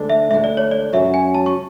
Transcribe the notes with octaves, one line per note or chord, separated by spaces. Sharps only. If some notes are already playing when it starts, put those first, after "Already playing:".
Already playing: D2 D3 G#3 D4
E5
D2 D3 G#3 D4 E5
D5
C#5
D5
F#2 C#3 F#3 C#4 F#4 E5
G#5
A5
C#6